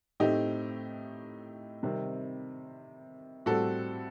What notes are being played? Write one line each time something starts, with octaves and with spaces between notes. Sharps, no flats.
A2 A3 C4 D#4 G4
C3 D#3 G3 C4
A2 G3 C4 F#4 A4